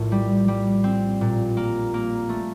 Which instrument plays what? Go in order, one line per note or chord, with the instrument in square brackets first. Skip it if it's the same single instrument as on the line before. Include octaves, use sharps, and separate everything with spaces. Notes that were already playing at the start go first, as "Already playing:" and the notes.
Already playing: [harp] A#1 A2
G3
G3
C4
A#2
A#3
A#3
A3